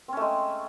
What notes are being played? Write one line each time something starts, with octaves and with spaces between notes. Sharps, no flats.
G#3 A3 C4 C#4